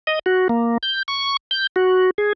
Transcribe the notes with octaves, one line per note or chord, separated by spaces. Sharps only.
D#5
F#4
A#3
G6
C#6
G6
F#4
G#4